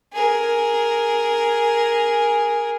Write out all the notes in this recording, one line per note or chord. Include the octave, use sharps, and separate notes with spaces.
G#4 A#4